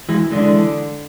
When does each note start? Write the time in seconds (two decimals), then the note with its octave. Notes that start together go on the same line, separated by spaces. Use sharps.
0.09 E3 G#3
0.31 D3 E3 G#3